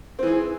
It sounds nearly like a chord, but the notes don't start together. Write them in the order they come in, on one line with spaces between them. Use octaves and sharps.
C4 E3 G#4